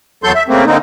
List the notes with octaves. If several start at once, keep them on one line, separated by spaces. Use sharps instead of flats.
E2 F#3 A4 C6 G6
E5
C#3 A3 A#3 C4
D3 A#3 C4 D#4